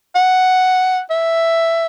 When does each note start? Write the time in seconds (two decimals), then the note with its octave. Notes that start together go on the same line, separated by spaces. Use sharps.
0.15 F#5
1.10 E5